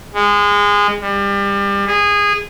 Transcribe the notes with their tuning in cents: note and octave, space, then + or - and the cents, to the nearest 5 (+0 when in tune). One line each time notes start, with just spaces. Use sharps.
G#3 -20
G3 +30
G#4 -20